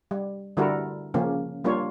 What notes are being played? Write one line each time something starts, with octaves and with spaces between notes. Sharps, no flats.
G3
D3 G3 E4 F#4 A4 A#4
C#3 F3 A#3 C#4
G3 A#3 D4 F4 C#5